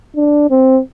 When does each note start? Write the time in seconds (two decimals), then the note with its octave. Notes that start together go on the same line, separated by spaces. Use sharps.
0.16 D4
0.50 C4